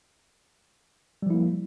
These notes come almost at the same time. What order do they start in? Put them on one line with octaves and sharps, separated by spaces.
G3 F3 E4 A#3